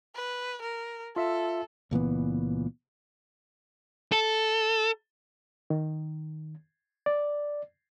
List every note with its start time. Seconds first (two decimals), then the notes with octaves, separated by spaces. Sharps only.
0.15 B4
0.62 A#4
1.16 F4 A4 E5
1.91 C#2 A#2 E3 B3
4.12 A4
5.70 D#3
7.06 D5